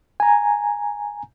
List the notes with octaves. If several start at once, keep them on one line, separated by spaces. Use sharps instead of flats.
G#5 A#5